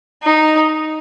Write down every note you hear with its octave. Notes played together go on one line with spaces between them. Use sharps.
D#4